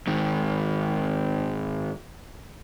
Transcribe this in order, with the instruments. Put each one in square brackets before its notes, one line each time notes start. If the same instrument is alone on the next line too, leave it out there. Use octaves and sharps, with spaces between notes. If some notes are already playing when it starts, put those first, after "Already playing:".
[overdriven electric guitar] G#2 D#3